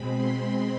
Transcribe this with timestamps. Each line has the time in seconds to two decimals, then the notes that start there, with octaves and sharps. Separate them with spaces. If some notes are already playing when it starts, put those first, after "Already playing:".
Already playing: B2 G#3 C4 B5
0.14 C6
0.43 B5